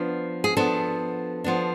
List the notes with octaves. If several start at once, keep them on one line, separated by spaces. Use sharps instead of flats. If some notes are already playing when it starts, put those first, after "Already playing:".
Already playing: F3 B3 D4
G#4
F3 B3 D4 A4
F3 B3 D4